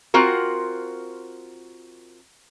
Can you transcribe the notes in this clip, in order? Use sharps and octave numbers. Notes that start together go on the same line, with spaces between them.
C4 F4 F#4 A#4